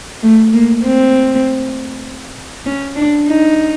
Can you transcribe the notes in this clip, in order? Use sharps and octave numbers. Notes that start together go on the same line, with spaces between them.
A3
A#3
C4
C#4
D4
D#4